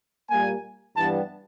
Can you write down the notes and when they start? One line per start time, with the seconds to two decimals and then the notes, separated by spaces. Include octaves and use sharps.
0.30 A#2 G3 A#3 G#5
0.97 G2 E3 G3 B3 A5